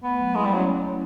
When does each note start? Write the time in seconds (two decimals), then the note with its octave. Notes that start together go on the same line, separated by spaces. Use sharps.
0.03 A3 B3
0.19 F#3
0.35 G#3 E4
0.45 G3
0.52 F#3 C#4